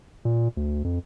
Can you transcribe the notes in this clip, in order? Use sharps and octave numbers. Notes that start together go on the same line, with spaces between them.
A#2
D2
F2